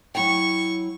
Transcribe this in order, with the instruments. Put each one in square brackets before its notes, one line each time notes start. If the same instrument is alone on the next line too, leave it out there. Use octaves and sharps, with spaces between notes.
[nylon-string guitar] F#3 E4 G5 [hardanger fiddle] C#6